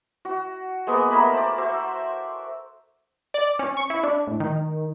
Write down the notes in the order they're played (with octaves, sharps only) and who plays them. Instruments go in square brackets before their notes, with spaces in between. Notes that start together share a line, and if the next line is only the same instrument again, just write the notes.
[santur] F#4
G#3 A#3 B3
A3 A#4 G#5 B5
C5 D5
F#4 C5 E5
[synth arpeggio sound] D5
C#4
C#6
E4
D4
A2
D#3